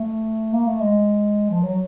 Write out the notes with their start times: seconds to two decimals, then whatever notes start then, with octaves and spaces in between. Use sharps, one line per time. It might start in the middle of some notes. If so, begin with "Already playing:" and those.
Already playing: A3
0.53 A#3
0.67 A3
0.81 G#3
1.50 F3
1.63 F#3